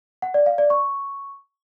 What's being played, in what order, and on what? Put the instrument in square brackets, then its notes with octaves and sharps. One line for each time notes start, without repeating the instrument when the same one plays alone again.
[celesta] F#5
D5
F5
D5
C#6